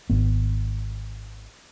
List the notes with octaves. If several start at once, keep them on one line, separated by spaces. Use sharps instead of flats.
G#1 B3